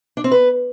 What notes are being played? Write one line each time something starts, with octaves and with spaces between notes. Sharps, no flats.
D4
C4
B4